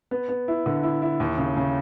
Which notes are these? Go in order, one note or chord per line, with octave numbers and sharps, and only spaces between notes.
B3
B3
E4
D3
E4
E4
D#2
C#3
C#3